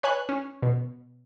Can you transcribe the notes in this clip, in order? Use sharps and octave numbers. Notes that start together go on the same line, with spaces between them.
B4 C#5 G#5 F#6
C#4
B2